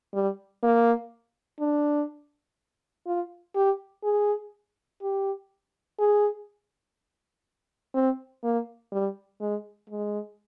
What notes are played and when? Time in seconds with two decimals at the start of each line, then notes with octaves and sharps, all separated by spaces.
0.14 G3
0.63 A#3
1.60 D4
3.06 F4
3.55 G4
4.04 G#4
5.02 G4
5.99 G#4
7.94 C4
8.44 A#3
8.92 G3
9.41 G#3
9.90 G#3